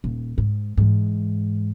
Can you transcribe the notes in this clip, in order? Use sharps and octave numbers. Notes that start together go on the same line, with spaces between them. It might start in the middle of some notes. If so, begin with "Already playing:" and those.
D#1
G#2
G#2 E3